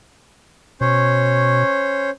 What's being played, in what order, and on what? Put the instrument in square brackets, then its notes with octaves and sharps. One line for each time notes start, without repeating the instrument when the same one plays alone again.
[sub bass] B2 [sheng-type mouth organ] C#4 C5 C#5